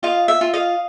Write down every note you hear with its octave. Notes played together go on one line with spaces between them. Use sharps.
F4 D#5 F5
E5
F4
D#5 F5